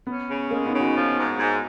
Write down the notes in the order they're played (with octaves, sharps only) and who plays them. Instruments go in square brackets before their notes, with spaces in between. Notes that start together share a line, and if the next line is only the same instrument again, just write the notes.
[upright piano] B3 [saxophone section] C#4
[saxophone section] C#3
[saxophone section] G#3 [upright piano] A#3 C#4
[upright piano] B3 D#4
[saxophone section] C#3
[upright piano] D#4 F#4
[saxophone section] F3
G#2
G#2